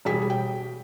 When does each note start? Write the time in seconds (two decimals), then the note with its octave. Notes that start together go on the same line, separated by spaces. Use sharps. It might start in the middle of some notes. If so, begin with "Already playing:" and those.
0.05 E1 G3 G4 G#4 B6
0.30 G5